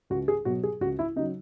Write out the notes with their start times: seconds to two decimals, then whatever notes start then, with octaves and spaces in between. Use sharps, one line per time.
0.10 C#2 F#4
0.28 G#4
0.45 B2 F#3 F#4
0.63 G#4
0.81 C#2 F#4
0.99 E4
1.16 C#3 D#4
1.19 F#3